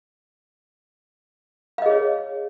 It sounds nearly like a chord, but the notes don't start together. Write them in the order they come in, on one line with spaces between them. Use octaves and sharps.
F5 D#5 G#4 C#5